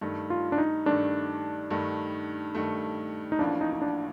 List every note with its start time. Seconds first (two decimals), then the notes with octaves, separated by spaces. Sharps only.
0.01 G2 D#3 A3
0.30 F4
0.52 D4
0.58 D#4
0.86 G2 D#3 A3 D4
1.70 G2 D#3 A3
2.54 G2 D#3 A3
3.32 D#4
3.39 A1 A2 F3 A#3 D4
3.61 D#4
3.73 D#4
3.82 D4